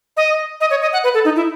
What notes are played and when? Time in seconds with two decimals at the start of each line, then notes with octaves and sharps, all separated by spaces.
0.17 D#5
0.61 D#5
0.71 C#5
0.82 D#5
0.93 F#5
1.04 B4
1.14 A4
1.25 D#4
1.36 E4